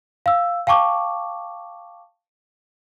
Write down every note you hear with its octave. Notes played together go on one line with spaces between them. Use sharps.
F5 E6
F5 G5 A5 C#6 D6